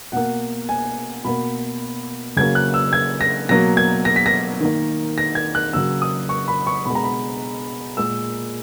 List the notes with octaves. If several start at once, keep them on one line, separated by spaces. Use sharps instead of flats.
B2 A#3 F#5
G#5
B2 A#3 B5
C#3 F#3 A#3 G#6
F#6
E6
G#6
A#6
B2 F#3 A#3 A#6
G#6
A#6
B6
A#6
D#3 A#3
A#6
G#6
F#6
C#3 F#3 A#3 E6
D#6
C#6
B5
C#6
B2 G#3 B5
A#5
B5
A#2 G#3 E6